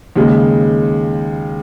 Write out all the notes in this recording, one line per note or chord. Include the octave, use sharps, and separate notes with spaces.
D#2 C#3 G#3